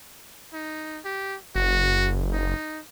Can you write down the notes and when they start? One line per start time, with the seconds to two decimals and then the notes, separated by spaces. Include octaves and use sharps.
0.53 D#4
1.05 G4
1.55 F#1 F#4
2.32 D#4